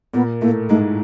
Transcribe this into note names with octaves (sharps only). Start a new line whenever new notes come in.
A#2 A#3 B3
A2 A3 A#3
G#2 G#3 A3